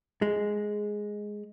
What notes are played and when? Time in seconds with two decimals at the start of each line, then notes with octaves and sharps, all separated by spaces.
0.22 G#3